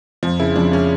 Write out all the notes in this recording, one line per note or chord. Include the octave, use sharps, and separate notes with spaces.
F2 F3
C#3 E4
F2 D4
C#3 C#4